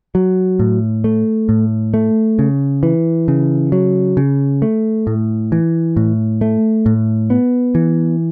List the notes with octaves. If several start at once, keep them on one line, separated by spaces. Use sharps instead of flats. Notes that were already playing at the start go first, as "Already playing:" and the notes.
F#3
A2
A3
A2
A3
C#3
E3
C#3
F#3
C#3
A3
A2
E3
A2
A3
A2
B3
E3